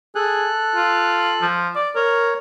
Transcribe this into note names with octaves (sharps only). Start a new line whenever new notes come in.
G#4 A4 F#6
F4
F3
D5
A#4 C#5